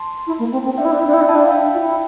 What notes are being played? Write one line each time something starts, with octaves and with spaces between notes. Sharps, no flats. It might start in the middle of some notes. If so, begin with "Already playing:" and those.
Already playing: A5 C6
E4
A#3
C4
C4
D4 E5 G5
E4
D4
E4
D4
E4 E5 G5
D4
E4 A5
D4 G5
F5
E5 G5
F4
E4